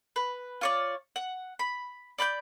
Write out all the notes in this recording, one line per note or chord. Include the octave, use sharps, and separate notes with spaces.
B4
F4 C#5 D5
F#5
B5
D5 B5 F#6 G6